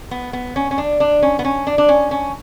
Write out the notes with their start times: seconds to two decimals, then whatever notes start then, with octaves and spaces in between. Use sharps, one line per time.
0.11 B3
0.33 B3
0.56 C#4
0.71 C#4
0.78 D4
1.00 D4
1.23 C#4
1.39 B3
1.45 C#4
1.67 D4
1.78 D4
1.89 C#4
2.11 C#4